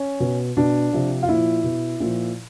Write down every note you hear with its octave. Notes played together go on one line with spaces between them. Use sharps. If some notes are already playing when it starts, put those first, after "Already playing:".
Already playing: C#4
B2
B2 D4
C3 F3
F4
A#2 F3 E4
B2
A#2 F3